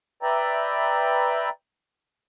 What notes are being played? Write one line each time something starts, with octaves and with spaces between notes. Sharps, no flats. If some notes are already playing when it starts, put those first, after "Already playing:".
B4 D5 E5 G5 A#5